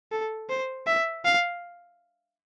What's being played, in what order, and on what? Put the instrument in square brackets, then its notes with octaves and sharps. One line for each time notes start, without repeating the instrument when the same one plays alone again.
[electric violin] A4
C5
E5
F5